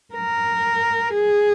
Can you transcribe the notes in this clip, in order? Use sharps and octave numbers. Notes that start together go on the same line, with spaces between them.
A#4
G#4